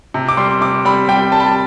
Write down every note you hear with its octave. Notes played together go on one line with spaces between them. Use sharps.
C3
D6
G3 C6
C3 D6
G3 B5
G3 G5
G3 A5
B5
A5